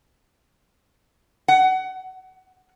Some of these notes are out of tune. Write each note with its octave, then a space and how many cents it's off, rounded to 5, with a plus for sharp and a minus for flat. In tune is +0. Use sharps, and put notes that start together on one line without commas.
F#5 +25